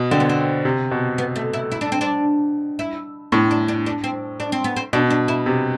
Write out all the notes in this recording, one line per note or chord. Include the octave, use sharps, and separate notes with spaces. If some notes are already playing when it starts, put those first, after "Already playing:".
Already playing: B2
D3 C4
B3
C4
C3
B2
B3
A3
E4
E4
D4
C4
D4
E4
A2 D4
D4
D4
D4
C4
D4
C4
B3
C4
B2 D4
D4
E4
C3